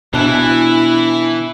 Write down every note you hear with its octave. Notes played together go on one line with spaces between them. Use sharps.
B2 E3 D4 E4 A5 F#6